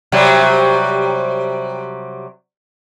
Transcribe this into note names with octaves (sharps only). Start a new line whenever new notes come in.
C3 F#3 G3